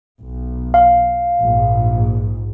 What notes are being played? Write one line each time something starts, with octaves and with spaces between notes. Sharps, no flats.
B1
F5
A#1 G#2